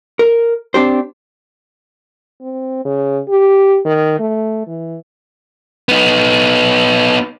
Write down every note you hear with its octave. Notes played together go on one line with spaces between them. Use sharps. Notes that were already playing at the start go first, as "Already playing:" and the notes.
A#4
C4 D4 G4 C5
C4
C#3
G4
D#3
A3
E3
B3 D#4